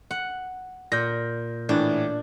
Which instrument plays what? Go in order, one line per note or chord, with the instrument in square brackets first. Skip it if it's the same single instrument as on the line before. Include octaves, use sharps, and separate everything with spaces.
[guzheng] F#5
[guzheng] A#2 [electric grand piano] G6 A#6
[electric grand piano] A2 E3 [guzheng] D4